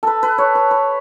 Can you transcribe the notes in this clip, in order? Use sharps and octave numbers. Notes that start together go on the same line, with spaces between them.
A4 B4
B4
C#5
B4
B4